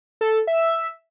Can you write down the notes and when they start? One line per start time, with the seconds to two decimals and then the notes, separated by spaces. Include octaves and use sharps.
0.21 A4
0.47 E5